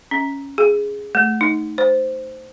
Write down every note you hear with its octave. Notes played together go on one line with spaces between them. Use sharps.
C#4
G#4
A3
D#4
C5